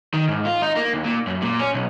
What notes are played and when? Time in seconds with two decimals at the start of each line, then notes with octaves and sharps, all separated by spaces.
0.14 D#3
0.29 G#2
0.45 F4
0.62 D#4
0.77 A#3
0.93 D#2
1.05 A#2
1.27 F#2
1.42 A#2
1.60 C#4
1.74 B1